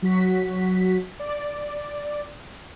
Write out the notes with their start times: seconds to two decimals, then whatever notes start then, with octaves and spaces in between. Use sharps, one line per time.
0.02 F#3 F#4 B6
1.19 D5